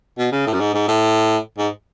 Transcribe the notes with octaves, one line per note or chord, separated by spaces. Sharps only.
B2
C#3
A2
F#2
G#2
G#2
A2
G#2